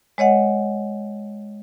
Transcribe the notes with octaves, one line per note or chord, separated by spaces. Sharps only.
G#3 C#5 D#5 F#5